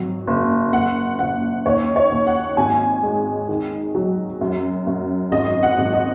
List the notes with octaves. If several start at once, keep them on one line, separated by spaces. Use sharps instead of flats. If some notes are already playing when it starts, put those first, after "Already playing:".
Already playing: G#1 F#3
F#1
F#1 F#5
F#1 F#5
D#2 C#5
C#5
D#2
F#5
G#1 G#5
G#3
D#3
F#3
F#2
F#2
G#1 D#5
F#5
G#1
D#5